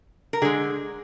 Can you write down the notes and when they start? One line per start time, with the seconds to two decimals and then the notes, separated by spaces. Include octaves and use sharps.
0.33 A#4
0.42 D3 G#3 G#4